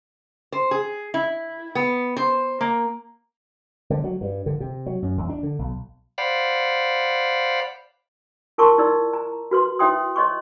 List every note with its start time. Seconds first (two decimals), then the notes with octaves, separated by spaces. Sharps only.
0.52 C5
0.71 G#4
1.14 E4
1.75 B3
2.17 C5
2.61 A#3
3.90 D3
4.04 F#3
4.21 G2
4.46 D3
4.60 C3
4.86 F#3
5.02 F#2
5.18 E2
5.29 D4
5.43 D3
5.59 B1
6.18 C5 D5 F5 F#5 B5
8.58 F4 A#4 A5 C6 C#6 E6
8.78 E4 D5 E6
9.13 A#5
9.51 F#4 B4 C6
9.79 E4 C#5 E5 G5 C6 D#6
10.16 C#5 D#5 C6 C#6